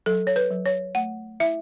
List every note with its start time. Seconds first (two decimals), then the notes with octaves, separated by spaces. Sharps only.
0.06 F#3 A4
0.27 C#5
0.36 B4
0.51 F#3
0.66 C#5
0.95 A3 F#5
1.40 E4 E5